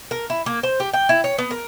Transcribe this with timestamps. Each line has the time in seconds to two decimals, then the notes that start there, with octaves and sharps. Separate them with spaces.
0.11 A#4
0.30 E4
0.46 A#3
0.63 C5
0.80 G4
0.93 G5
1.09 E4
1.24 C#5
1.38 B3
1.51 A#4